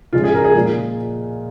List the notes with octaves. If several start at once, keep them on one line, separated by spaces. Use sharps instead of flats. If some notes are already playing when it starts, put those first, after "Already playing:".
C#3 F3 G#3 F4
G#4
A#4
G#4
A#2 F3 G#3